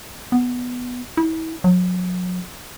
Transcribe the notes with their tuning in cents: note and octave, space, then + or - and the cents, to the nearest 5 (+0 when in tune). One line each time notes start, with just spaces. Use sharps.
B3 +0
E4 -35
F#3 -35